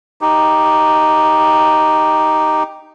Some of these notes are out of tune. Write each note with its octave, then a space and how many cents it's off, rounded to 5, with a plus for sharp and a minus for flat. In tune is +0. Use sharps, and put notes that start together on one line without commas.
D#4 +0 G4 +0